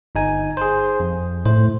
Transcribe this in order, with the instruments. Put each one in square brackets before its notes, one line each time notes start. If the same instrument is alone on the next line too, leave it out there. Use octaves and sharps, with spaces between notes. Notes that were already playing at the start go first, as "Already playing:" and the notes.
[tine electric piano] G1 D#4 G#5
G#4 C5
F2
[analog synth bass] A2 [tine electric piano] C5